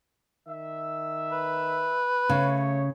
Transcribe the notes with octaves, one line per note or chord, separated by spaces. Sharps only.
D#3 E5
B4
C#3 A3 C#5